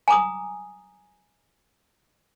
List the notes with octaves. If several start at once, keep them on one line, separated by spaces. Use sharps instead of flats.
G#5 A#5 D6 D#6